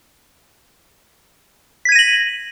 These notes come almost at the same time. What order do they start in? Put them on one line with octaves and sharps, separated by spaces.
B6 G#6 D#7 A#6 F#7